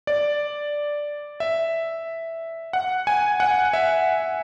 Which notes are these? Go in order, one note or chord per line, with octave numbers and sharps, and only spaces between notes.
D5
E5
F#5
G#5
F#5
E5